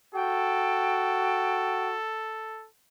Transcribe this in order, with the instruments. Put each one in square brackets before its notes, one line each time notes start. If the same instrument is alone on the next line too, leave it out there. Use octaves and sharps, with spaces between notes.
[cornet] F#4 [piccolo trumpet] A4 [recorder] G5